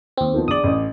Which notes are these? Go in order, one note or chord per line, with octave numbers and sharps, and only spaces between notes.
D#2 C4
D#3 F3 B3
A#1 D5 D#6 F#7
A1